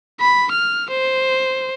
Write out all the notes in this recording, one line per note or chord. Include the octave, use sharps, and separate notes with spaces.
B5
F6
C5